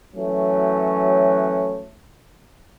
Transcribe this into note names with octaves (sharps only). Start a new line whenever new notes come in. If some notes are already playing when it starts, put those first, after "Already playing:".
E3 F#3 A3 C#4